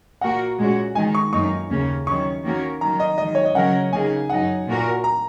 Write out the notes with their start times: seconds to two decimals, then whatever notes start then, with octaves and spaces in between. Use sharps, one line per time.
0.21 A#2 A#3 F#4 A#4 F#5
0.59 A#2 G#3 C#4 F#4
0.95 D#3 G#3 D#4 G#5
1.15 C#6
1.32 F#2 F#3 A#3 D#4 C#6
1.69 D#2 C#3 A#3 C#4
2.06 D#3 F#3 C#4 C#6
2.43 D#3 A#3 C#4 F#4 A#4
2.81 D#3 F#3 A#3 A#5
3.00 D#5
3.18 G#2 D#3 F#3 D#5
3.35 C#5
3.45 D#5
3.55 C#3 F#3 C#4 A#4 F#5
3.93 C#3 A#3 D#4 G#4 G#5
4.29 F#2 F#3 D#4 F#5
4.67 A#2 A#3 F#4 A#4
5.04 A#5